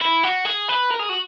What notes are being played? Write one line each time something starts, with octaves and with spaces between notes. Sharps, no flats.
E4
F#4
G#4
B4
A#4
G#4
F#4